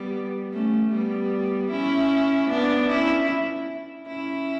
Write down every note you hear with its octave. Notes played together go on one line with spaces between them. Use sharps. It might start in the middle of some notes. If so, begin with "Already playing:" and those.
Already playing: G3 B3
A3 C#4
G3 B3
C#4 E4
B3 D4
C#4 E4
C#4 E4